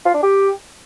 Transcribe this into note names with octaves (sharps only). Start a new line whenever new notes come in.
F4
D4
G4